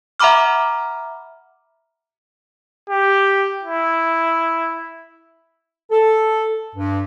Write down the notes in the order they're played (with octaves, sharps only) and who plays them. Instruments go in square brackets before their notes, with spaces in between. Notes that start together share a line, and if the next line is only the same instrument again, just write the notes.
[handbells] E5 F#5 A#5 B5 D6 F6
[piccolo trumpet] G4
E4
[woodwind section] A4
G2